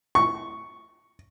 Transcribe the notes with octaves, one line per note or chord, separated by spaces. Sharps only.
C#6